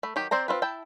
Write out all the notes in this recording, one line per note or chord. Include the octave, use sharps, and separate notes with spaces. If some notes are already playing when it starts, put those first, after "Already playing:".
A3 B5
D#3 F#3 G4
C4 C5 D5 A#5
C4 E4 F4 B4
E4 G5 A5